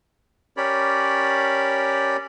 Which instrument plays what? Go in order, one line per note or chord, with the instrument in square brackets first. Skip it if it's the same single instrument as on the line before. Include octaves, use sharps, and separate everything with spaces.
[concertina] C#4 G4 A#4 C#5 D5 B5